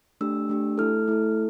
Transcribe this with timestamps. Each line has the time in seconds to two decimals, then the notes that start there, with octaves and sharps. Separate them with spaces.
0.21 A3 D4 G4 E6
0.49 A3 D4 G4
0.78 A3 E4 A4 F6
1.08 A3 E4 A4